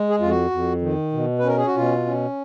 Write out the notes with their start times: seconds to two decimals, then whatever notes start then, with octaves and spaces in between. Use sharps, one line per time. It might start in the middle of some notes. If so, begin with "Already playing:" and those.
Already playing: G#3
0.10 G#4
0.19 F2 F4
0.30 F#4
0.51 F2
0.81 D#3
1.12 B2
1.39 B4
1.44 C#4 A#4
1.57 G#4
1.67 F#4
1.76 B2 F4
2.06 C#4